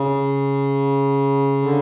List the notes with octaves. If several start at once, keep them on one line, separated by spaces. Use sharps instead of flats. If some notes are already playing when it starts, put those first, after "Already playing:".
Already playing: C#3
D3